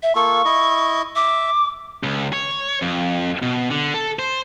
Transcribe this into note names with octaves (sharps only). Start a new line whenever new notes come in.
E5
A#3 F4 A4 C#6
E4 D#5
E5 D6
C#2
C#5
F2
B2
D3
A4
C5